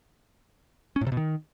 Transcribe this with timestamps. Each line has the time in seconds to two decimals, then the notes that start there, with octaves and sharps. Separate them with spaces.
0.96 C#4
1.01 A2
1.07 C3
1.12 B2
1.17 D#3